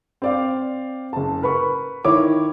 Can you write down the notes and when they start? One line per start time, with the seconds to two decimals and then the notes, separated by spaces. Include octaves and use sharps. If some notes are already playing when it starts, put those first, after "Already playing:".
0.22 C4 D5 F5
1.13 F#1 A5
1.42 A#4 B4 B5 C#6
2.05 D#3 E4 C#5 D6